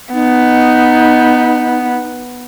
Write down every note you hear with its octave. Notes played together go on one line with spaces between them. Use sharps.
B3 D#4